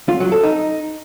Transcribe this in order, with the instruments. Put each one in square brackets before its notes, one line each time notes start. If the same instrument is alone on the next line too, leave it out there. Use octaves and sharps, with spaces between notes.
[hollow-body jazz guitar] F4
F#3
A4
D#4